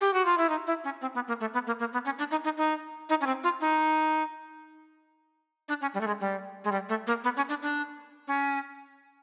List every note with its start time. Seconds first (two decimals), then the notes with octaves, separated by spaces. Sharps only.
0.01 G4
0.14 F#4
0.25 F4
0.38 E4
0.49 D#4
0.67 E4
0.84 C#4
1.02 C4
1.15 B3
1.28 A#3
1.41 A3
1.54 B3
1.67 A#3
1.80 A#3
1.93 B3
2.05 C#4
2.19 D4
2.31 D#4
2.44 D#4
2.58 D#4
3.09 D#4
3.21 C#4
3.26 C4
3.44 F4
3.61 D#4
5.69 D4
5.81 C#4
5.94 G3
6.01 A3
6.07 G#3
6.20 G3
6.64 G#3
6.72 G3
6.89 A3
7.07 A#3
7.24 B3
7.37 C#4
7.49 D4
7.62 D4
8.28 C#4